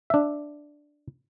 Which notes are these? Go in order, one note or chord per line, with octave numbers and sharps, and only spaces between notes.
D4 E5